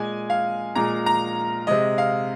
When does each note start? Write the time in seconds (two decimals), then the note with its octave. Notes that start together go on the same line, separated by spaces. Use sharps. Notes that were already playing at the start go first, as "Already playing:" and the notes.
Already playing: A#2 G#3 G#5
0.30 F5
0.75 A#2 G#3 A#5
1.06 A#5
1.67 C3 G#3 D#5
1.98 F5